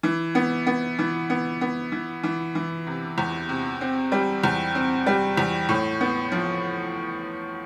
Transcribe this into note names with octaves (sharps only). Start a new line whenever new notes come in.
E3
B3
B3
E3
B3
B3
E3
E3
E3
C3
E2
C3
C4
G3
E2
C4
G3
E2
A2
B3
F3